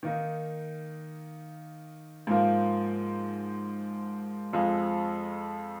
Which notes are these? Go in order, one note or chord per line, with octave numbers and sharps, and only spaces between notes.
D#3 A#3 D#4
G#2 F3 A#3
F2 F3 G#3